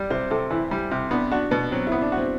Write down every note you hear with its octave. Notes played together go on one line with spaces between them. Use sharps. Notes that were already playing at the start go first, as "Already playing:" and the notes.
Already playing: G3 D5
C3 C5
C3 A4
E3 E4
G3
C3
B3 D4
D4 F#4
B2 B3
F#3 C4
B3 E4
D4
F#4
C4